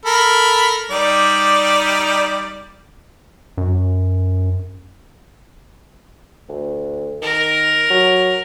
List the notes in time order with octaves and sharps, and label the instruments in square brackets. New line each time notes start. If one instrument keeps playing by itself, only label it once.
[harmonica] A4 A#4 B5
G3 D#4 D5
[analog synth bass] F#2
[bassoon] D2
[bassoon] D#3 [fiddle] A#4
[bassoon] F#3